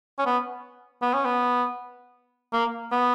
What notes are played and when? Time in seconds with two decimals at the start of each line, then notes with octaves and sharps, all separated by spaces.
0.19 C#4
0.26 B3
1.02 B3
1.14 C#4
1.25 B3
2.53 A#3
2.92 B3